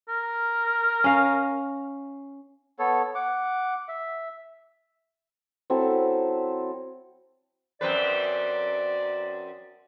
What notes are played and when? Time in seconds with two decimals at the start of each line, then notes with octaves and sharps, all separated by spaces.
0.09 A#4
1.04 C#4 F5
2.79 B3 A4 C#5
3.15 F#5 D6
3.88 E5
5.70 F#3 C4 E4 A4
7.81 F#2 C4 B4 D5